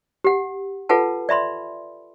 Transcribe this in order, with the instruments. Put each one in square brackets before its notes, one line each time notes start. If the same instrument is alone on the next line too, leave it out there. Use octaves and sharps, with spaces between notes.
[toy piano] G4 F#5
F4 A4 B4 F#5 A5
D5 E5 B5 C6